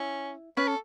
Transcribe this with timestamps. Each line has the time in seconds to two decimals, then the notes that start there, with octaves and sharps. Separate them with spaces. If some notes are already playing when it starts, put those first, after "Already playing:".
Already playing: C#4 E4
0.57 C#4 B4
0.68 A4